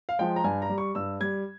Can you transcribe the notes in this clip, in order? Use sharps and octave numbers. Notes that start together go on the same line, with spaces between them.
F5
F3 G#3 G5
A#5
G2 G#5
A#5
G3
C#6
G2 E6
G3 G#6